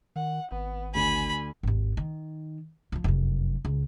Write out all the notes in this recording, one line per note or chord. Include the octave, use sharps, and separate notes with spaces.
D#3 F#5
G#1 B3
D2 D3 G#5 B5
G#1 D#2
D#3
D3 F3
F1 F#2
C#2